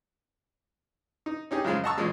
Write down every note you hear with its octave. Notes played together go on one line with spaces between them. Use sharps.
D#4
C#4 D#4 G4 G#4
F#2 C#3 F3 G#3 F4
D#5 F#5 A5 A#5 C#6 E6
A1 A#2 G#3